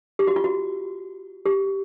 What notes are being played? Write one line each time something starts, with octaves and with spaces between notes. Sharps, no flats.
G4
F#4
F4
F#4
G4